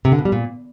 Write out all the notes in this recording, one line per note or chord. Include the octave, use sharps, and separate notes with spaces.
C3
D3
B2
G3
A#2